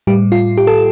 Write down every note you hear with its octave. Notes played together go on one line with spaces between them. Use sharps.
A2 G3 G4
F4
G4
A4